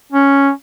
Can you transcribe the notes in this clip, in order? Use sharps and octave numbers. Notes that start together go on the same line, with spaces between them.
C#4